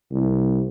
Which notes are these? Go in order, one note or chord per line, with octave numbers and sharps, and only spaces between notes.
C2